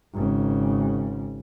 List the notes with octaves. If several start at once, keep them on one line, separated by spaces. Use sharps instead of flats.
G#1 C#3